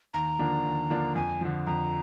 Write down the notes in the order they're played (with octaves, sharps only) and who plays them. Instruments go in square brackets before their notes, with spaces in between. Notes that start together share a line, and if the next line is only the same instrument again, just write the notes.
[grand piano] D#2 [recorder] A#5
[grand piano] D3 F3 A#3 D4
D#2
D3 F3 A#3 D4
[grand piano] F2 [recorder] G#5
[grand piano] D3 F3
[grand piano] F2 [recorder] A#5